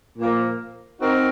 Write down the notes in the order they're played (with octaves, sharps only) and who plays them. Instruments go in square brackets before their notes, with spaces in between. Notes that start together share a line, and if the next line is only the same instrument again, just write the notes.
[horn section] A#2 F3 A#3
C4 D#4 F#4 A#4